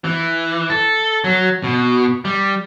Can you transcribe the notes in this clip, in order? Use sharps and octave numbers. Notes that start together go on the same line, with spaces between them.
E3
A4
F#3
B2
G3